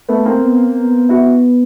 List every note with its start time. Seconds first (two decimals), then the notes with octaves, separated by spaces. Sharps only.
0.09 A3 B3
0.25 A#3 C4
0.43 B3
0.76 B3
1.09 E4 F#4